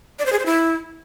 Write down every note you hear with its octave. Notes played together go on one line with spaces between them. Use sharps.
D5
C5
G#4
C5
E4